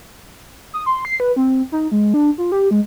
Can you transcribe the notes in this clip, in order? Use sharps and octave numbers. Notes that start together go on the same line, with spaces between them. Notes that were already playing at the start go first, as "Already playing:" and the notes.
D#6
C6
C7
B4
C4
D#4
G#3
D4
F4
G4
G#3